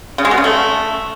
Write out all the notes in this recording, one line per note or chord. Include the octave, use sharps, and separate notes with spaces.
C#3
G#3
B2
C#3
A3